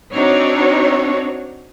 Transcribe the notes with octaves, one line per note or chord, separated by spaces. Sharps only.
C4 D4 D#4 F#4 C#5